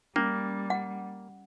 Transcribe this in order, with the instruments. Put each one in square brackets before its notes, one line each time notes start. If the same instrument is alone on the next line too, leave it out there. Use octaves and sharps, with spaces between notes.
[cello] G3 [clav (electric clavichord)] A#3 [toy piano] C#4
[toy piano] F#5